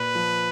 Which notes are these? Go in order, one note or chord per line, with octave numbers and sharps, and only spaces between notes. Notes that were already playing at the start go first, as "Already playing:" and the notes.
Already playing: A#2 B4
F3